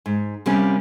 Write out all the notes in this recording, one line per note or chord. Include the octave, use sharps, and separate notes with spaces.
G#2
C3 G3 A#3 C#4